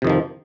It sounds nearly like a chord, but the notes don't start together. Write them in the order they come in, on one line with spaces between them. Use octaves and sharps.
C3 F2 D#3 F3